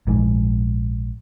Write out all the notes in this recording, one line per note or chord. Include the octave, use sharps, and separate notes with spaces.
A#1 G#2